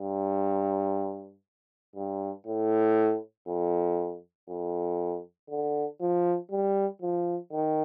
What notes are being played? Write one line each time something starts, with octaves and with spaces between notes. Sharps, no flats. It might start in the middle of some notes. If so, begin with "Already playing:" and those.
Already playing: G2
G2
A2
F2
F2
D3
F3
G3
F3
D#3